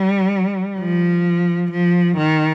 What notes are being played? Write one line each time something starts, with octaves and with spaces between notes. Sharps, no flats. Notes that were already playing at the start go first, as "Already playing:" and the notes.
Already playing: G3
F3
F3
D#3